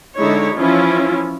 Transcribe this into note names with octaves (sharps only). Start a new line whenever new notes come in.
D3 G#3 D#4 E4 C#5
E3 F3 C#4 E4 F4